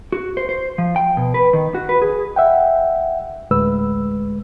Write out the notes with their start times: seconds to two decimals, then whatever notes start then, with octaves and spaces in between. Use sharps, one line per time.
0.12 F#4
0.37 C5
0.49 C5
0.78 F3
0.96 G5
1.17 B2
1.34 B4
1.53 D#3
1.75 F#4
1.89 B4
2.02 G#4
2.36 E5 F#5 G5
3.51 D2 A2 G#3 B4 E6